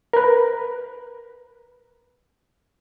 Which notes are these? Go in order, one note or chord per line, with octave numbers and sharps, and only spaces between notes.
A#4 B4